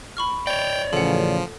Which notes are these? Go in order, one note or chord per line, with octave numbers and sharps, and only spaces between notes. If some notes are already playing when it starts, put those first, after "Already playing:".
B5 C#6 F6
C#5 D5 G5
A1 C#3 F3 A4 F#5